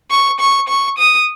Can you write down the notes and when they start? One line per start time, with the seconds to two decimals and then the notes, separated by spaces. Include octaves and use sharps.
0.11 C#6
0.40 C#6
0.68 C#6
0.98 D#6